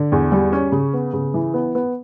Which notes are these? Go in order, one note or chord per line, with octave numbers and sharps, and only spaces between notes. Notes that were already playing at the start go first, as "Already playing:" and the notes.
Already playing: D3
E2
G3
C#4
C#3
B3
C#3
E3
B3
B3